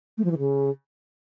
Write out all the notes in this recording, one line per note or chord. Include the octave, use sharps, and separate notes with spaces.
A3
F3
E3
C#3